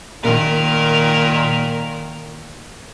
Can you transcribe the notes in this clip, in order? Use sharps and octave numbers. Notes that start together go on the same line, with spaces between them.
A#2 D#3 A#4